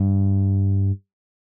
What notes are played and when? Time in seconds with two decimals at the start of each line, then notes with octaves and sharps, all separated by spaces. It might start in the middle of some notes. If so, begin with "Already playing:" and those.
Already playing: G2